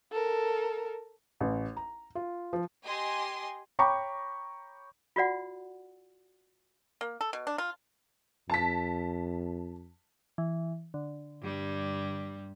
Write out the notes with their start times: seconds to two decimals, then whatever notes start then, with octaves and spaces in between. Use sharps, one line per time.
0.12 A4 A#4
1.40 A1
1.77 A#5
2.15 F4
2.53 F3
2.83 G4 D#5 G#5 C6
3.79 C#5 G5 A#5 B5 C#6 D6
5.16 F4 F#4 D5 F#5
7.01 A#3
7.21 A4
7.33 B2
7.47 D4
7.58 F4
8.50 F2 A5 B6
10.38 E3
10.94 D3
11.42 G2 G3